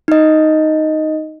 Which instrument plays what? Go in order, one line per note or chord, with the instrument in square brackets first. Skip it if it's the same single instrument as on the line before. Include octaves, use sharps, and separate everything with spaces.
[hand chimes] D#4 D#5